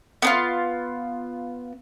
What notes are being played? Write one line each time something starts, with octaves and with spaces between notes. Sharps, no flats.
B3 D4 F4